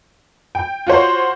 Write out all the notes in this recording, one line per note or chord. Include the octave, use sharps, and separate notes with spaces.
G5
F4 F#4 C5 C#5